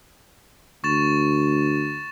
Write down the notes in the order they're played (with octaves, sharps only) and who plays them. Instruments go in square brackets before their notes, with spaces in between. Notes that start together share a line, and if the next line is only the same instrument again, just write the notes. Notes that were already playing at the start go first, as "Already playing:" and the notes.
[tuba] D2 [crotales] C#6 A6 E7